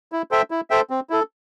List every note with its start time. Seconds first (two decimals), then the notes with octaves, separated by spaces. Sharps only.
0.12 E4
0.31 A4 C5 E5 G5
0.51 E4
0.70 A4 C5 E5 G5
0.90 C4
1.10 E4 A4